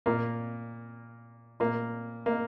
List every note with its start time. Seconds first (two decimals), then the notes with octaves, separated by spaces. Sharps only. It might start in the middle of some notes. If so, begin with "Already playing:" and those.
0.06 A#2 A#3
1.60 A#2 A#3
2.26 A#3